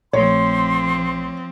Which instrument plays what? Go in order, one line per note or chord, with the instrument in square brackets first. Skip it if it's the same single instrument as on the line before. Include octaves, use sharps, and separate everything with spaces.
[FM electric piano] A#1 A3 [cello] F3 C4 [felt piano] C#5 [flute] C6